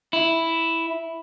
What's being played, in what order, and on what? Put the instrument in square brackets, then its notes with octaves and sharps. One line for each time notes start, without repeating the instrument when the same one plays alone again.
[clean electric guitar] E4